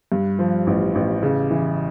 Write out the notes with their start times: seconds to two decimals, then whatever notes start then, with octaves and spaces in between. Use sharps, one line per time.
0.12 G2
0.39 F3
0.67 A1
0.95 A1
1.23 C#3
1.51 E3